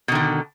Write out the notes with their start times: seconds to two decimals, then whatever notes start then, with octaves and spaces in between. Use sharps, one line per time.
0.08 B2
0.12 D#3
0.15 D3